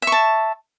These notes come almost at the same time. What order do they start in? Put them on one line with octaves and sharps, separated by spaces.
E5 C#6 A5